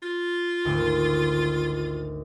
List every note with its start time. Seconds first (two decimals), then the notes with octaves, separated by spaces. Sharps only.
0.03 F4
0.65 G#1 D2